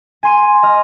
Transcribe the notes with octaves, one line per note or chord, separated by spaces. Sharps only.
G#5 C6 D#7
D#5 F6